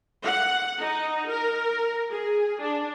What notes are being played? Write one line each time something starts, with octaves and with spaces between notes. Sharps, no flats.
F#5
D#4
A#4
G#4
D4